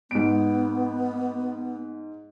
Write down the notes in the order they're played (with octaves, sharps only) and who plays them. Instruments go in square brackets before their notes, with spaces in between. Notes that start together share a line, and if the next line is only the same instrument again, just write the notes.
[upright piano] G#2 D7 [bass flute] B3